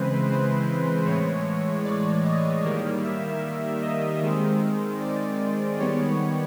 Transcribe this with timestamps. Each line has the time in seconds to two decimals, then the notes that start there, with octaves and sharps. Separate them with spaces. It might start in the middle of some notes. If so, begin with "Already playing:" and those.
Already playing: C#3 E3 G#3 C4 B4 C5
0.27 C5
1.05 A2 E3 G#3 C#5
1.85 D5
2.24 D#5
2.63 D#3 G3 A#3
3.03 E5
3.82 D#5
4.21 D#3 G#3 C4
5.00 D5
5.79 D#3 G3 B3 C#5